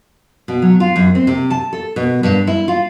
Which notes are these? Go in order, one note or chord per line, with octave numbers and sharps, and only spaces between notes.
B2
F#3
F4
F#2
C4
C3
A5
A4
B2
G2
E4
F4